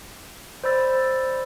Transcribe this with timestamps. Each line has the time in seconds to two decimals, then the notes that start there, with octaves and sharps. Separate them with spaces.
0.64 C5 D5 B5 E6 A6